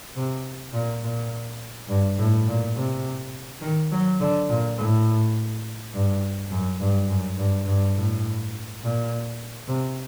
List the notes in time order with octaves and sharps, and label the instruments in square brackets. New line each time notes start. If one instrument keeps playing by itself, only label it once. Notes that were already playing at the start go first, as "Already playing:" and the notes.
[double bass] C3
A#2
A#2
G2
A2
A#2
C3
D#3
F#3
D3
A#2
A2
G2
F#2
G2
F#2
G2
G2
A2
A#2
C3